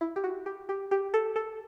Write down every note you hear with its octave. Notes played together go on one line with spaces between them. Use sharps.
E4
G4
F#4
G4
G4
G4
A4
A4